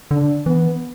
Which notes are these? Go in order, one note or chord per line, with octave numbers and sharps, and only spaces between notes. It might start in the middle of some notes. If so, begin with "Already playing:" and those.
D3 D4
E3 B3